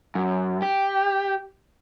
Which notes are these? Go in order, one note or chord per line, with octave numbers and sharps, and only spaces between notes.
F#2
G4